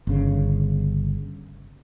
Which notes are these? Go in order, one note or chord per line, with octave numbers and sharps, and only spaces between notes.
G1 C#3